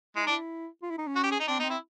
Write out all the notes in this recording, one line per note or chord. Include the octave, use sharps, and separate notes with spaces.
G#3 E4
D#4
D4
E4
F4
E4
D#4
C#4
F#4
G4
G#4
D#4
C4 D4
B3 D#4
C4
E4